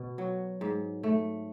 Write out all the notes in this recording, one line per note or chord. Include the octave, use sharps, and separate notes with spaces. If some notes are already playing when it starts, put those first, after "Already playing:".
Already playing: B2
F#3
G#2
A3